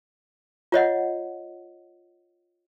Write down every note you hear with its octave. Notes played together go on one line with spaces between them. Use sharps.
F4 C#5 D#5 F#5